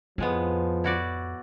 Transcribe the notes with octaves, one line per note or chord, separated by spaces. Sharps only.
F2 A2 F3 G#3 B3
E4 F#4 D5